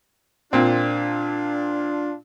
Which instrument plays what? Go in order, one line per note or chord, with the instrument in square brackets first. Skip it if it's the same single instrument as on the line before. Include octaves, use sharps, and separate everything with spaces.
[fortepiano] A#2 C4 [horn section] D4 F4